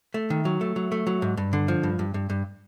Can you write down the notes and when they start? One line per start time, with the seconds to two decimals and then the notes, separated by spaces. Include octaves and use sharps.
0.14 A3
0.30 D#3
0.45 F#3
0.61 A3
0.76 F#3
0.92 A3
1.07 F#3
1.22 G#2
1.37 G2
1.53 D3
1.68 F3
1.83 G2
1.99 G2
2.14 G2
2.30 G2